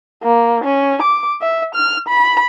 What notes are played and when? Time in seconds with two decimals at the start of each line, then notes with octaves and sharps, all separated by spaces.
0.24 A#3
0.64 C#4
1.02 D6
1.42 E5
1.75 F6
2.08 B5